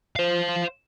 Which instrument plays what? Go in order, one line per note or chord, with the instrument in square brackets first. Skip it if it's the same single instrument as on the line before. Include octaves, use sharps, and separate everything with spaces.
[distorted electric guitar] C5 F5